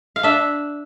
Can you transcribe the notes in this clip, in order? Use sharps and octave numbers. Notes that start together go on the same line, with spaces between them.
F5
D4 E5